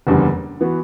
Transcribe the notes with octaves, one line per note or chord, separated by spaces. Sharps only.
F#1 E2 D3 G3
E3 B3 F#4